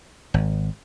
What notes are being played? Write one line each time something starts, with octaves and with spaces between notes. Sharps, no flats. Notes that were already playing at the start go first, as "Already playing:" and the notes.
G#1